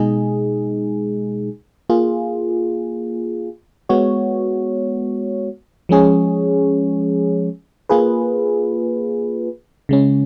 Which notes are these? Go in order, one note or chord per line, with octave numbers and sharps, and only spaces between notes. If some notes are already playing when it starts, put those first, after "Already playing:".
Already playing: B2 G#3 D#4 G#4
A#3 F4 G#4
G#3 B3 F#4 C#5
F3 G#3 C#4 G#4 C#5
A#3 F4 G#4 B4
C#3 G#3 C#4